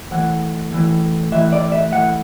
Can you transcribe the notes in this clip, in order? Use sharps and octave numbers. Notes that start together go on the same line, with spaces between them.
A2 E3 F#5
A2 E3
A2 E3 E5
D5
E5
A2 E3 F#5